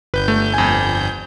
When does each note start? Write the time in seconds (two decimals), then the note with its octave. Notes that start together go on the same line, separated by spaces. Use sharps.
0.14 G1 B4 G6
0.28 A3
0.54 F2 G#5